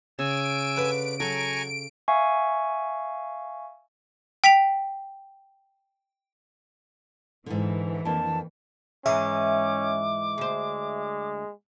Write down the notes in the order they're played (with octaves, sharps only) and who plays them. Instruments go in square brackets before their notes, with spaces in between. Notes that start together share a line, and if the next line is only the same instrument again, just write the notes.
[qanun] C#3 [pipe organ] G#5 E6 [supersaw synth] D7
[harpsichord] D3 B4
[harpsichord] F#3 [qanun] A4 [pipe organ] G#5 A#5 C#6
[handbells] E5 F5 G#5 C#6
[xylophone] G5 B6 D7 F7
[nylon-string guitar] G#2 D3 [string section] E3
[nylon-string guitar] F2 A#3 D4 [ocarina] A5
[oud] G#2 E3 G#3 [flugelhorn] C#4 [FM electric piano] E5 [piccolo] D6
[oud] D2 C5 [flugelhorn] G#3